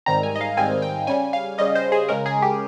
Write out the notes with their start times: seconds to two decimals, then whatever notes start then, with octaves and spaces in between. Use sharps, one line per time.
0.06 G#2 D#3 G3 C4 A#5
0.23 G#5
0.36 D#5
0.41 F5
0.57 G#2 D#3 G3 C4 G#5
0.82 G5
1.07 C#3 G3 C#4 G#5
1.33 F5
1.58 C#3 G3 C#4 D#5
1.75 C5
1.92 G#4
2.09 C#3 G#3 C#4 A#4
2.26 G#4
2.42 G4